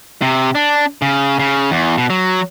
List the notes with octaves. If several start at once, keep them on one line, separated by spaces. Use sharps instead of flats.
C3
D4
C#3
C#3
E2
B2
F#3